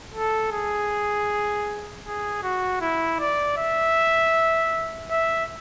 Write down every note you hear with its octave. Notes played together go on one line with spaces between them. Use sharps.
A4
G#4
G#4
F#4
E4
D5
E5
E5